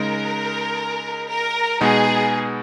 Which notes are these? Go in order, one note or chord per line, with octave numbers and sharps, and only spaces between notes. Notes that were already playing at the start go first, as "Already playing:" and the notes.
Already playing: C#3 G#3 D#4 A#4
A#4
B2 G#3 B3 D#4 G#4